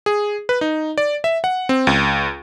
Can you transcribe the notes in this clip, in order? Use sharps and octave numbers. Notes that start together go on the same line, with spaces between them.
G#4
B4
D#4
D5
E5
F#5
C4
C#2